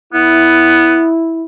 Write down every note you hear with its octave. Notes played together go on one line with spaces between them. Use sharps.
B3 E4